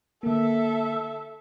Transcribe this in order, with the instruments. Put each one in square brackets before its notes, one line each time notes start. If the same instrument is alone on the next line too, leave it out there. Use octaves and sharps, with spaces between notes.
[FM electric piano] D3 A#3 [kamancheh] A4 E5